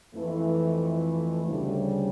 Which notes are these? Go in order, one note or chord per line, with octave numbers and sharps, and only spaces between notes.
F2 E3 A3
D2 C#3 G3